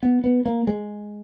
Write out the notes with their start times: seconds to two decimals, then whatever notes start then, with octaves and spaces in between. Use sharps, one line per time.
0.03 B3
0.24 B3
0.45 A#3
0.67 G#3